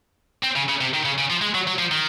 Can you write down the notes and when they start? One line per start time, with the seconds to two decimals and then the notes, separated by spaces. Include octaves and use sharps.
0.44 C4
0.56 C#3
0.69 C#3
0.81 C3
0.94 D#3
1.05 C#3
1.18 C#3
1.30 F3
1.42 G#3
1.55 F#3
1.67 F#3
1.79 F3
1.92 D#3